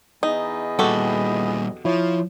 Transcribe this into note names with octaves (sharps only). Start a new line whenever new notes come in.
E2 B3 D#4 D#5
A#2 G3 F#4 G4 A4
F3 E4 F4 C#5